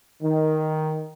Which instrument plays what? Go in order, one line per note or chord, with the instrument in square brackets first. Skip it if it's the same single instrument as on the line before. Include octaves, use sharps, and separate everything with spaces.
[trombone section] D#3